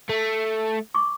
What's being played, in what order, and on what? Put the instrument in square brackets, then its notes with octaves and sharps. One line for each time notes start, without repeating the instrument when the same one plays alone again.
[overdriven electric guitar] A3
[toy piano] C#6 D6